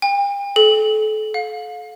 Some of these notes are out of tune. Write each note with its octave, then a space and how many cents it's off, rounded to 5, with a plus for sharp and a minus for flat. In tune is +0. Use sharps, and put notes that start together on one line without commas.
G5 +40
A4 -35
F5 +30